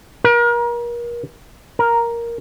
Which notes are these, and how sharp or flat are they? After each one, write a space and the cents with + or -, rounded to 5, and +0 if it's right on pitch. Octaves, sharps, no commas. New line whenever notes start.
A#4 +35
A#4 +5